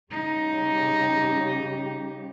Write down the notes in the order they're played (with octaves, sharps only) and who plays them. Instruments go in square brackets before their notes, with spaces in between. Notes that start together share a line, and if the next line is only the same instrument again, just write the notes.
[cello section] C#3 G3 G4 [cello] D#4